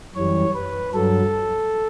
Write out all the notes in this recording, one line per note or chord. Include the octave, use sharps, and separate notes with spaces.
F#2 E3 G3 C#5
B4
G2 F#3 A4